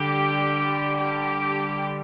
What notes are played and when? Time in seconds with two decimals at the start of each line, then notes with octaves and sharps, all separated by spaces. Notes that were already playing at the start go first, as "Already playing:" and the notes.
Already playing: D3 G3 G4
0.98 G4